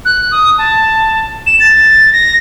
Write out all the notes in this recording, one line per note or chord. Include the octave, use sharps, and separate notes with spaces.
F#6
D#6
A5
E7
A6
A#6